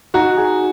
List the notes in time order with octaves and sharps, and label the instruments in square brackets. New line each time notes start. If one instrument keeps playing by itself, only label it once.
[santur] D#4 [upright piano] F#4
[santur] G#4